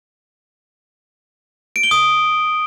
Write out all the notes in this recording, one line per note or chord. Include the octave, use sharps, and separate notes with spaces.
D7
G7
D#6